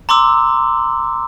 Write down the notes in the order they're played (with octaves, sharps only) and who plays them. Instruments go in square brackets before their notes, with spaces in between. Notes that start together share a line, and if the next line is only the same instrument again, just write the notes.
[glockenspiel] A#5 C6 D6 E6